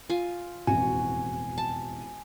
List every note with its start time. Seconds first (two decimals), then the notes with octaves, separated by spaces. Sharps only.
0.10 F4 G#5
0.67 E1 A1 F2 F#4 G#5
1.58 A5